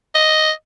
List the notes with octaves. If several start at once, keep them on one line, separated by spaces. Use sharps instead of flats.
D#5